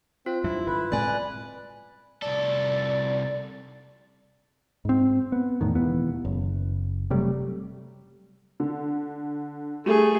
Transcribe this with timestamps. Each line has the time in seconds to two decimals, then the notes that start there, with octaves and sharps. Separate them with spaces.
0.26 C4 F4
0.44 D2 G2 F#3 E4
0.66 G1 B4
0.92 A2 G#3 C4 D5 G#5 F#6
2.22 C2 A4 D5
4.85 G#2 C4
5.32 B3
5.61 E2 A2 D#3
5.75 E1 D#2 E3 B3
6.25 F#1
7.10 C3 F#3 G3 A3
8.60 D3
9.86 G3 A3 G#4 D#7